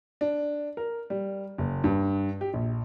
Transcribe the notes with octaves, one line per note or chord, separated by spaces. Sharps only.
D4
A#4
G3
F#1
G2
G4
A#1